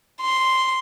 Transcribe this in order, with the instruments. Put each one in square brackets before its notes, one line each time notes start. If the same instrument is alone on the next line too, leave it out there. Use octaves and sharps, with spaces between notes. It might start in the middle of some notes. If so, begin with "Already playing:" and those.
[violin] C6